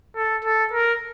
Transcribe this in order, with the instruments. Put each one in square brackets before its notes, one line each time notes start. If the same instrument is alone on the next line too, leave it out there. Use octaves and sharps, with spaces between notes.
[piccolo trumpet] A4
A4
A#4